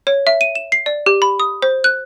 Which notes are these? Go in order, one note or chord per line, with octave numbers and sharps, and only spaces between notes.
C#5
E5
D#7
E7
C7
D5
G4
B5
D#6
C5
F#6